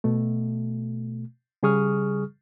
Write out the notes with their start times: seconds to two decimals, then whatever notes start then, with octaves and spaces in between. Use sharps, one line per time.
0.04 B2 A3
1.63 C#3 G3 G#4 C#6 D#6 F6